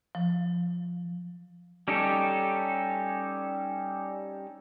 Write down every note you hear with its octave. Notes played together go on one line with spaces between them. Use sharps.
F3
G3 C#4 D#4 G4 A4